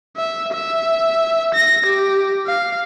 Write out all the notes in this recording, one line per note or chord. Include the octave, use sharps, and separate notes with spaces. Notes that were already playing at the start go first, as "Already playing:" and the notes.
E5
E5
A#6
G4
F5